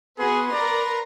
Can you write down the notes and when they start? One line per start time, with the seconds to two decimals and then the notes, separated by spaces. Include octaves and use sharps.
0.19 B3 F#4 G#4 B4 C6
0.52 A#4 D5 A#5